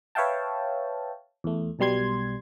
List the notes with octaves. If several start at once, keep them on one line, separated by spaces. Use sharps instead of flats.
B4 C#5 E5 F5 G5 A5
E2 A3
B1 B2 G3 C6 G#6